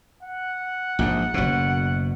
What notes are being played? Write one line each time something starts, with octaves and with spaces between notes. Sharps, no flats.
F#5
A#1 G#2
F#1 B2